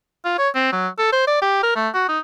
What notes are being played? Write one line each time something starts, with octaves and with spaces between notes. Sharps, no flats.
F4
C#5
C4
F#3
A4
C5
D5
G4
A#4
A3
F#4
D#4